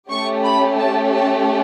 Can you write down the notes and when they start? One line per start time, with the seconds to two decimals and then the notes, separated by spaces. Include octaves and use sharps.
0.10 A3 C#4 G4 C#6
0.44 B5
0.78 A5
1.14 A5